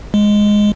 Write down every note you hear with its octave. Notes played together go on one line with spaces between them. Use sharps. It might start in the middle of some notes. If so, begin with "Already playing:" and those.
G#3